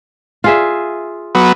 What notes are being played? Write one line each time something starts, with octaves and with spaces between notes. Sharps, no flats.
F4 G#4 E5
F#3 B3